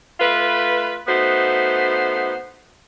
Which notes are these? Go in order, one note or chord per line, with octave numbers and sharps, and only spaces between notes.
A3 F4 B4
A3 B3 D#4 F#4 C5